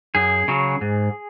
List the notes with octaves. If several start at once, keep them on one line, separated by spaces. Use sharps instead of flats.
F#2 G#4
C#3 F#3
G#2